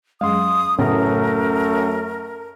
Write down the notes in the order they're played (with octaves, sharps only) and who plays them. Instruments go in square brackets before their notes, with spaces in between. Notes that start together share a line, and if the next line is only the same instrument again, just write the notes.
[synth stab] F#2 G#3 [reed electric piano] F5 C6 [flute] D#6
[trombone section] F#2 A3 [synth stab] A2 C#3 B3 [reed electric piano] C#4 [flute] A#4